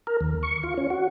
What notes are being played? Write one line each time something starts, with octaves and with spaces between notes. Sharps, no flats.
A#4
D#2
C#6
F4
C#4
F#4